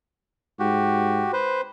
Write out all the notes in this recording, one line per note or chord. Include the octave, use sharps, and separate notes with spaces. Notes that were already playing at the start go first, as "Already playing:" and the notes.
G#2 F#4 G4
B4 C5